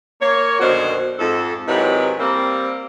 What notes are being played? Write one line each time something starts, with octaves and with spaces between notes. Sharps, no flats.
A#3 C#5
F#2 B2 D3 D#3 F#4 C5
F2 G#2 A4
D#2 C3 F#3 G#3 E4 B4
G3 A#3 C4